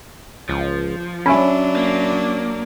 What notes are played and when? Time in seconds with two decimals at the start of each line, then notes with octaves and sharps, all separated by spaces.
0.49 C#2 F3
1.26 F#3 C#4 D4 E5 G#5 B5
1.76 A#3